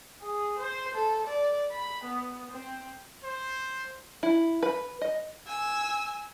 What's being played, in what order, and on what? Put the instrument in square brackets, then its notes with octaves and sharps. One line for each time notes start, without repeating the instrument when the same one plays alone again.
[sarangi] G#4
C5
A4
D5
B5
B3
C4
[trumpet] C5
[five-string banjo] E4
B4
D#5
[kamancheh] G#5 E6